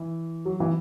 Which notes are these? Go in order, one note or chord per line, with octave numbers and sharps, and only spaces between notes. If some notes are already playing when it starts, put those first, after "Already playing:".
Already playing: E3
F#3
E3